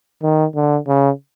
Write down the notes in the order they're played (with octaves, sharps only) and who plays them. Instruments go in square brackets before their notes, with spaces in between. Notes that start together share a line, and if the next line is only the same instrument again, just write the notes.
[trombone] D#3
D3
C#3